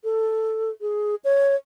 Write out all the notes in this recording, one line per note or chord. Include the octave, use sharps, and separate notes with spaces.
A4
G#4
C#5